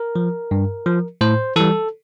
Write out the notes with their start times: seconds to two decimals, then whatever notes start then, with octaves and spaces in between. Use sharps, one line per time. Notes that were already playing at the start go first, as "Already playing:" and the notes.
Already playing: A#4
0.16 F3
0.51 G2
0.86 F3
1.21 A2 C5
1.56 E3 G3 A4